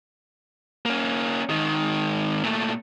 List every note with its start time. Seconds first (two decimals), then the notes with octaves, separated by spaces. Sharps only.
0.86 A#3 C#4
1.49 G#2 D#3
2.43 A#2 A3